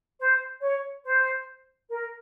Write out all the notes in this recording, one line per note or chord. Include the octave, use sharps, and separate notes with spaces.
C5
C#5
C5
A#4